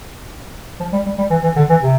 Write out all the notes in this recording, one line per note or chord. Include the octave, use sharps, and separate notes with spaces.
F3
G3
G3
G3
E3
E3
D3
E3
C3